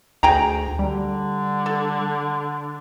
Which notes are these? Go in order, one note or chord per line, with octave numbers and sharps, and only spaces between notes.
D2 G#4 G5 A#5
D3 G3
A4